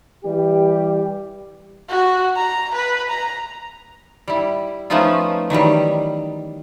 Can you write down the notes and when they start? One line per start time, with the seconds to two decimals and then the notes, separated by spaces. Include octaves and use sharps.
0.24 E3 G3 G4
1.89 F#4
2.36 A#5
2.75 B4
3.10 A#5
4.28 G3 E4
4.90 F3 A3 B3 C#4 D#4 F4
5.50 D#3 E3 F#3 G3